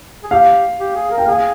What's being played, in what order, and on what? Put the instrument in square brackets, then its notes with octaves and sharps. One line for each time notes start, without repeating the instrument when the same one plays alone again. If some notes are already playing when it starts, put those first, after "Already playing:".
[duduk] G#4
[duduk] G4 [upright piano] F5
[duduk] G4
G#4
A#4
[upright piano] G5
[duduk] G#4 [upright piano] F5